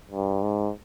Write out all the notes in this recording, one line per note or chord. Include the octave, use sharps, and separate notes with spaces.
G2
G#2